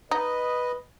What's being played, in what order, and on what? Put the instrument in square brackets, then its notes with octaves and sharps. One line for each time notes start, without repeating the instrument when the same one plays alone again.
[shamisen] D#4 [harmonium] B4 D#5